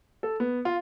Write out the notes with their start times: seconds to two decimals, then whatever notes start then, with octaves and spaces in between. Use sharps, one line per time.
0.23 A4
0.40 B3
0.65 F4